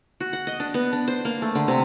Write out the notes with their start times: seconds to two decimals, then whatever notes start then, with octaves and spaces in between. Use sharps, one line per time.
0.20 F#4
0.33 F#5
0.47 D#5
0.60 D4
0.74 B3
0.93 D4
1.08 C5
1.25 A#3
1.42 A3
1.55 D3
1.68 C3